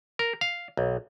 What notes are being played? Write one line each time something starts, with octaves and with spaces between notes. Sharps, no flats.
A#4
F5
B1